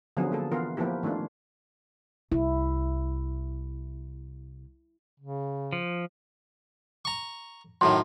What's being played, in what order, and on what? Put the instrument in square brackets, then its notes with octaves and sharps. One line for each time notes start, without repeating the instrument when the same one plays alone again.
[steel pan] D3 F3 F#3 B3 C#4 G#4
A#3 G#4 A4
E3 B3 F4 A#4
F3 A#3 B3 E4 G4
D#3 A3 C#4 D4 F4
[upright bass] C2 [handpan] E4
[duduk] C#3
[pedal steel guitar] F3
[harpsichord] A#5 C#6
[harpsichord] F#2 A2 D#3 [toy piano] C6